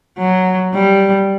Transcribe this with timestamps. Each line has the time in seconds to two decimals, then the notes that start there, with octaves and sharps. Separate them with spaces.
0.18 F#3
0.74 G3